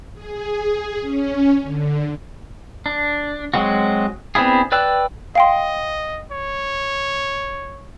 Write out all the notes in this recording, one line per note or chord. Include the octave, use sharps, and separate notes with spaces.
G#4
C#4
D3
D4
F#3 G#3 C4 F#4
B3 C4 D4 E4 G#4
B4 D5 G5 E6 F#6
D#5 F5 G5 C6
C#5